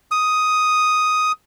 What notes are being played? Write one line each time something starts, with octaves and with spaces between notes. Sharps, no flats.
D#6